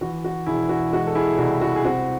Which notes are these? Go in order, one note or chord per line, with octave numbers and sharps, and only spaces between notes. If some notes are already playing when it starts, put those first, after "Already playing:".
E3 F#4
F#4
E1 E4 G#4
F#4
G#3 F#4
A4
E4 G#4
C2 F#4
F#4
G#4
C4 F#4